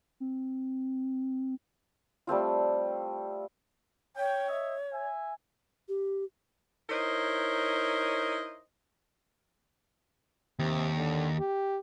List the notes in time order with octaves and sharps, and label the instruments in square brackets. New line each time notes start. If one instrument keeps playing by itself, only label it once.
[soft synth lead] C4
[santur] G3 A3 C4 F4
[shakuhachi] C#5 [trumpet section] G5
[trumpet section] D#5 E5
E5 G#5
[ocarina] G4
[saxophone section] D#4 E4 A#4 C5 C#5 D#5
[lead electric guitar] D#2 [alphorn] C3
[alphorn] D3
G4